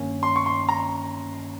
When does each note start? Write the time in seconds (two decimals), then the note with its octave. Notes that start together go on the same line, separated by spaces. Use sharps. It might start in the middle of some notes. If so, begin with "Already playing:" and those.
Already playing: G2 D#3 A#3 C#4
0.23 C6
0.36 C#6
0.46 C6
0.69 A#5